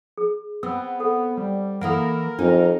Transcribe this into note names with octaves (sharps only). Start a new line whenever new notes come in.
G#4
B3 C4 E6
A4 F#5
G3
E3 A#3 E4 A4 A#4 F5 F#5
F2 D4 D#4